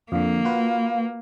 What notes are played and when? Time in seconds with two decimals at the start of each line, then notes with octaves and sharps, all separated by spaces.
0.12 F2 D3 A#3 F5
0.45 F4 F#4 B4